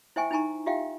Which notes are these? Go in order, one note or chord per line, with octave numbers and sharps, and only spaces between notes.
E4 C5 E5 G5 G#5 C#6
D#4 E4 G#5 A#5 C#6
F4 G4 E5 F5 G5